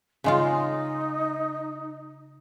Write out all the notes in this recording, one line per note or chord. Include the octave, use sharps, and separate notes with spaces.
C#3 G#3 D#4 F4